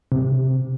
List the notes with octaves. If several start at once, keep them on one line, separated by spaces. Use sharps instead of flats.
C3